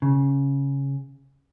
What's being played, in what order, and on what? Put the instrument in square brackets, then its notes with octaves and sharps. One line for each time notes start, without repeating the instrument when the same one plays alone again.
[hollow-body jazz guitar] C#3